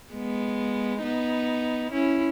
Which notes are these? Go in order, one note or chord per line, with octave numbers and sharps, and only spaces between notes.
G#3 B3
B3 D#4
C#4 E4